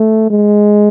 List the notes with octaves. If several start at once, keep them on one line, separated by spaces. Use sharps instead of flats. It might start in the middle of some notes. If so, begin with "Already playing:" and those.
Already playing: A3
G#3